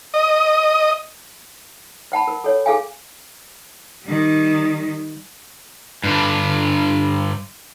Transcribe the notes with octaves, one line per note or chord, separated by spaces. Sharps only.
D#5
C5 F#5 A5 B5
A#4
A4 C#5
G#4 A4 F5 G#5
D#3 G3
G2 D3